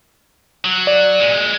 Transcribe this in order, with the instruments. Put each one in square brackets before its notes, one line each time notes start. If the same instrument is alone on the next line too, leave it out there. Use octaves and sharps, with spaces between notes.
[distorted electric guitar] F#3
[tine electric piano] D5
[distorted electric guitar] A#2 G#3